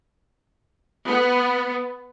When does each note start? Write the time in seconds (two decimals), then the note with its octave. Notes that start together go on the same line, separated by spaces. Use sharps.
1.07 B3